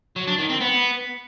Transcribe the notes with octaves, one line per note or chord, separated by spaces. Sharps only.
F#3
D4
D#3
C4
B3